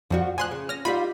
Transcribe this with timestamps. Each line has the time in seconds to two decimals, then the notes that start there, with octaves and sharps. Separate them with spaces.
0.10 F2 F3 G3 F#4
0.38 D2 F3 G#5 C6 F#6
0.51 C#3
0.69 C#4 F6 A#6
0.85 G3 D#4 F4 B5